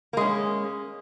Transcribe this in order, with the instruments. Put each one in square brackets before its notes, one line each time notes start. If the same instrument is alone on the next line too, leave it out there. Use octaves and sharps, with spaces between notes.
[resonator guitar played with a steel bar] A#3
G#3
C#4